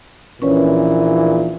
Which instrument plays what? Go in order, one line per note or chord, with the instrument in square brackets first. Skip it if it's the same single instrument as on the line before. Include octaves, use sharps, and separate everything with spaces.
[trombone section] A#1 A#2 E3 [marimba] C#4 B4 C#5